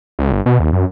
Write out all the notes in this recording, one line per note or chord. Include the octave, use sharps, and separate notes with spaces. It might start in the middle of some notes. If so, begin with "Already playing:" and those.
C#2
G1
B2
D#2
F#2